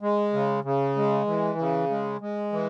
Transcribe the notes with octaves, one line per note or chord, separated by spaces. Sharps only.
G#3
C#3
C#3
G#3
E3
C#3
G#3
G#3
E3